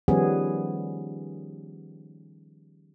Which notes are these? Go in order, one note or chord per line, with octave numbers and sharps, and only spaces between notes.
D#3 F3 G3 B3 C#4 G#4